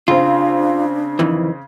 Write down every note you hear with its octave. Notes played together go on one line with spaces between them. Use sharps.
C#3 C4 D4 F4
F2 D#3 E3